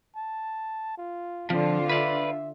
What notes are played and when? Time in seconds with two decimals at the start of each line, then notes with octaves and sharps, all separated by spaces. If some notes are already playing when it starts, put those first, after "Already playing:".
0.16 A5
0.98 F4
1.50 D3 F3 C4 F4
1.89 B4 D5 E5